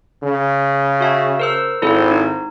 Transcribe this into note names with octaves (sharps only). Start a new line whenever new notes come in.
C#3
F#4 E5 A5
A#4 C5 E6
G#1 E4 A4 C5
D#4